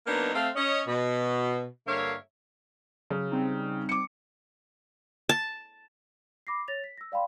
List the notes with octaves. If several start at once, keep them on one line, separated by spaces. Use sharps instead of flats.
F#3 A#3 B3 D4 D#4
A3 C4 F5
C#4 D#5
B2
G2 D3 A#3 C#5 E5 F5
C#3 F#3
G3 C4 D#4
D6 C#7
A5
B5 D6 A#6 C7
C#5 A6 A#6 F7
B6
E6 A#6
D5 F5 G5 B5 C6